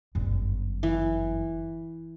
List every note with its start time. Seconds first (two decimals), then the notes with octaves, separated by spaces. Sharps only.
0.15 G1 F#2
0.83 E3